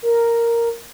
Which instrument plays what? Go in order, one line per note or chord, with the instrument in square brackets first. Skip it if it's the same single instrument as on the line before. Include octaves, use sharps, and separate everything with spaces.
[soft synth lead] A#4